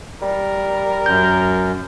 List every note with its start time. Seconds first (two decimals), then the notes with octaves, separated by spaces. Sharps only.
0.22 G3 A#4
1.06 F#2 G6